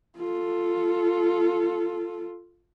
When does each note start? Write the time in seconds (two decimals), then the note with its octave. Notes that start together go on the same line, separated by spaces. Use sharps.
0.18 F4 A4